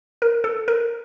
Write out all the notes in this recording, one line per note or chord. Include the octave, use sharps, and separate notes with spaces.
A#4
A4
A#4